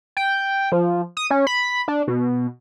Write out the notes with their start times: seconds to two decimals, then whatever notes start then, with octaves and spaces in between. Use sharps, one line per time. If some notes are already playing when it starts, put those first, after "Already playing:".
0.17 G5
0.72 F3
1.17 D#6
1.31 C#4
1.47 B5
1.88 D4
2.08 B2